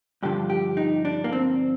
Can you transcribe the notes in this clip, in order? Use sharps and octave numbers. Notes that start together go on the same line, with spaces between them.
G2 D3 F3 G4
G4
D#4
D4
A#3
C4